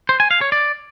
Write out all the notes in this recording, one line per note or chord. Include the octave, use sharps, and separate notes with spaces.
C5
G#5
F5
C#5
D5